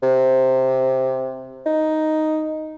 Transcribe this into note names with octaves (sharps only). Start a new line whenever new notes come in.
C3
D#4